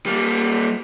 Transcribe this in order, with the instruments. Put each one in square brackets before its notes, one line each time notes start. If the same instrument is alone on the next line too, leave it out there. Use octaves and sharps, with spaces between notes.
[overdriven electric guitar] G3 A#3